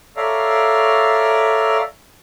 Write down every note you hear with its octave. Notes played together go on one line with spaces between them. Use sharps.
A4 C#5 D5 E5 F5 A#5